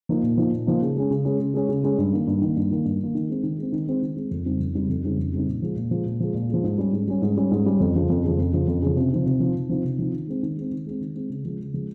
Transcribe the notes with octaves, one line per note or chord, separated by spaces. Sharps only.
F3 A#3 D#4
A#2
F3 A#3 D#4
A#2
F3 A#3 D#4
C#3
G#3 C#4
C#3
G#3 C#4
C#3
G#3 C#4
C#3
G#3 C#4
G2
D#3 A#3
G2
D#3 A#3
G2
D#3 A#3
G2
D#3 A#3
D#3
G#3 C4
D#3
G#3 C4
D#3
G#3 C4
D#3
G#3 C4
F2
C#3 G3 C4 D#4
F2
C#3 G3 C4 D#4
F2
C#3 G3 C4 D#4
F2
C#3 G3 C4 D#4
A#2
F3 G#3
A#2
F3 G#3
A#2
F3 G#3
A#2
F3 G#3
G#2
G3 C#4
G#2
G3 C#4
G#2
G3 C#4
G#2
G3 C#4
F2
C#3 F3
F2
C#3 F3
F2
C#3 F3
F2
C#3 F3
C3
F3 C4 D#4
C3
F3 C4 D#4
C3
F3 C4 D#4
C3
F3 C4 D#4
D#3
G#3 C4
D#3
G#3 C4
D#3
G#3 C4
D#3
G#3 C4
C#3
F3 G#3
C#3
F3 G#3